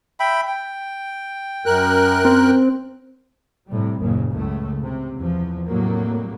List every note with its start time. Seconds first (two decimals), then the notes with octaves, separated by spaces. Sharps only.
0.20 E5 G5 B5
0.47 G5
1.66 F#2 A#4 F#6
2.25 C4
3.67 A2 C3 G3
4.00 F#1 D#2 A#2 C#3
4.30 C#2 F#2 A2 C#3 A3
4.82 C3
5.17 E2 F3
5.66 A2 C3 F#3 G3 A#3